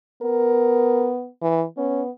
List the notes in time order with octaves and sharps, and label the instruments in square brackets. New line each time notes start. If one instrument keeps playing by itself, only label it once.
[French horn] B3 [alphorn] A#4
[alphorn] E3
[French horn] B3 [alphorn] C#4